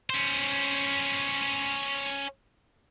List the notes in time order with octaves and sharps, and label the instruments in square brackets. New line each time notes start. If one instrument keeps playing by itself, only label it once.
[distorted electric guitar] C#4 C5